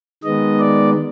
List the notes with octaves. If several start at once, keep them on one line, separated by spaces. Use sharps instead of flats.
D#3 G#3 B3 D#5
D5